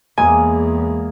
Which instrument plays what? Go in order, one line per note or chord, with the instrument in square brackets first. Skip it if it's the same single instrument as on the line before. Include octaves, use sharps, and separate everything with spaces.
[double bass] E2 [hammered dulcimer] G#3 A#3 [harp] G#5